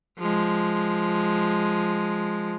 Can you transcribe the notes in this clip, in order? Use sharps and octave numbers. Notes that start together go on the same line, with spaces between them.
F3 G#3